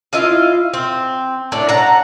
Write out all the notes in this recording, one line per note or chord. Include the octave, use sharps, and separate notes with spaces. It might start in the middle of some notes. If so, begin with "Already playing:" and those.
E4 F4 D#5 F5
C4
A2 D4 D5
F#5 A5 A#5